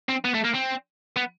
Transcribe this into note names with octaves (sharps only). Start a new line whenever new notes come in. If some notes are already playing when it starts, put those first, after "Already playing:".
C4
B3
A3
A#3
C4
B3